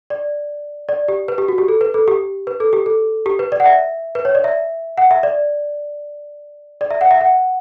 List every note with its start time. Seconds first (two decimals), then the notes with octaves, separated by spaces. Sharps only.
0.10 D5
0.89 D5
1.08 G4
1.28 B4
1.38 G4
1.48 F#4
1.58 G4
1.68 A4
1.81 B4
1.94 A4
2.08 G4
2.47 B4
2.60 A4
2.73 G4
2.86 A4
3.26 G4
3.39 B4
3.52 D5
3.60 F#5
3.66 E5
4.15 B4
4.25 C#5
4.35 D5
4.44 E5
4.98 F#5
5.11 E5
5.23 D5
6.81 D5
6.91 E5
7.01 F#5
7.11 E5
7.21 F#5